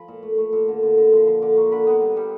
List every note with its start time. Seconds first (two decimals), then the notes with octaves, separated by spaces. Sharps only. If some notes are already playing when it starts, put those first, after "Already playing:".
Already playing: F3 B5
0.08 A#2
0.23 A3
0.38 A3
0.53 A#2
0.68 D3
0.83 D3
0.98 D3
1.13 F3
1.27 F3 C6
1.42 D3 D6
1.57 A#3 C#6
1.72 D3 B5
1.87 B3
2.02 G3
2.17 G3